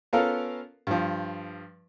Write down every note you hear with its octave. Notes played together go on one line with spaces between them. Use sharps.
B3 C#4 F4 A4 A#4 F5
G2 F3